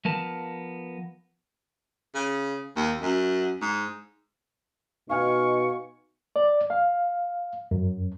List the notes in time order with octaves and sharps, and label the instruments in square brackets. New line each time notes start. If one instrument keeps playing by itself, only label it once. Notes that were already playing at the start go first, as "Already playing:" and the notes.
[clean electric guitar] F3 B3 A#4 A5
[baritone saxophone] C#3
D#2
F#2
G#2
[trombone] B2 [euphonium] D#4 [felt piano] F5 G#5 F6 [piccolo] C#6
[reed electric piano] D5
F5
F#2